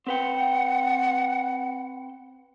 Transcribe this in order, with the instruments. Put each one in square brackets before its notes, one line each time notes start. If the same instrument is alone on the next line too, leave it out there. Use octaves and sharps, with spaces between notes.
[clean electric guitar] C4 B4 G5 [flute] F#5